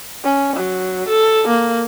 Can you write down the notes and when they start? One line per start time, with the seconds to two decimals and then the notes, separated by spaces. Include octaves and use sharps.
0.25 C#4
0.56 F#3
1.08 A4
1.47 A#3